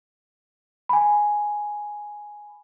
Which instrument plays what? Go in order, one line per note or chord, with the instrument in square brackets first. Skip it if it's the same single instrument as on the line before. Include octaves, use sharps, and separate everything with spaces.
[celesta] G#5 B5